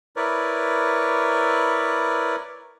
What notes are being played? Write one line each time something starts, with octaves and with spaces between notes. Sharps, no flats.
E4 A#4 B4 C#5 D5